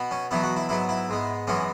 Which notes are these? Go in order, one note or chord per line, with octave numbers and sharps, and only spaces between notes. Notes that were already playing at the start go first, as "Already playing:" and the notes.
Already playing: B2 B3
C#4
E2 B2 F#3 B3 E4
F#4
E4
G#2 F#3 B3 E4
E4
G#2 G#3 B3
F#2 E3 G#3 B3 C#4